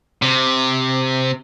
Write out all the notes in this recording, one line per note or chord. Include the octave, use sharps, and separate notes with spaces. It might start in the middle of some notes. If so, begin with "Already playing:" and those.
C3